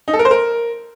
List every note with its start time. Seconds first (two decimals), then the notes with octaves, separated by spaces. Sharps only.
0.08 D#4
0.13 A4
0.19 A#4
0.25 C5
0.31 A#4